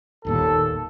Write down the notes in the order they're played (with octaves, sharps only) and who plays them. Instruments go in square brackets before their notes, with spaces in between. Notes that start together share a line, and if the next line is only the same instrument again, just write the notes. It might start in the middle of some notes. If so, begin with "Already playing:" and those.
[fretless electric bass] G1 D#2 A#2 [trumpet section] A4